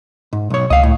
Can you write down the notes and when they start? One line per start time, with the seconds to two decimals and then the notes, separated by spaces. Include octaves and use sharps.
0.33 G#2
0.50 B1 C#5
0.70 C#2 D#5 F5
0.83 A2